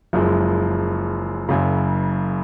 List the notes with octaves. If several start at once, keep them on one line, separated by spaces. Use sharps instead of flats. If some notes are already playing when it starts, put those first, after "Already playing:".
F#1 F#2 F3 G#3
F#1 F#2 C#3